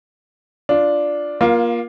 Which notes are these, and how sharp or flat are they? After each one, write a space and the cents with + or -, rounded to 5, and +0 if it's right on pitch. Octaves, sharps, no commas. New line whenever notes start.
D4 +0 F4 +0
A#3 +25 F4 +0